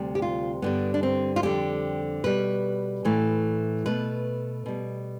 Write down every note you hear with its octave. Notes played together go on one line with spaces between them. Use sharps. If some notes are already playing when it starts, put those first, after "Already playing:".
Already playing: D2 C3 G3
G4
F4
G2 D3 G3 B3
D4
C4
F4
F2 D3 G3 G4
B2 G3 B4
A2 E3 A3
B2 A3 B4
B2 G3